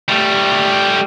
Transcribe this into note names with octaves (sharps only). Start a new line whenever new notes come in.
G3 A3